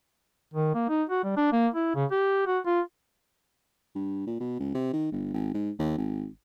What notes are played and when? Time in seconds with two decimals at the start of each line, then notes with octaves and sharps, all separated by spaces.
0.54 D#3
0.75 A#3
0.89 D#4
1.10 F#4
1.24 G3
1.37 D4
1.53 A#3
1.74 E4
1.95 C#3
2.11 G4
2.47 F#4
2.66 F4
3.95 G2
4.26 A#2
4.40 B2
4.59 C#2
4.74 C3
4.93 D#3
5.12 G1
5.33 G#1
5.54 G#2
5.79 D#2
5.97 G#1